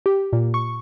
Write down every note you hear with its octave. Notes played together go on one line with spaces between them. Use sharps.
G4
A#2
C#6